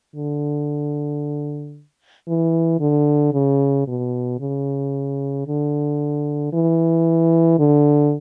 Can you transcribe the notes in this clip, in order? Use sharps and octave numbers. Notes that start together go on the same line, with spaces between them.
D3
E3
D3
C#3
B2
C#3
D3
E3
D3